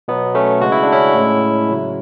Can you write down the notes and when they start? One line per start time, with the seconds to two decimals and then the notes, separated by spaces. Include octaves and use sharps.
0.08 B2 F#3 B3
0.35 A3 C#4
0.62 C#3 G#3 F#4
0.72 E4
0.83 D4
0.92 C#4 E4
1.15 A2 G#3
1.69 C#3 F#3